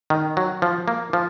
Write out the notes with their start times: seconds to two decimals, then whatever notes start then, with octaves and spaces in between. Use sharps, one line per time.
0.10 D#3
0.37 F#3
0.62 F3
0.88 A#3
1.13 F3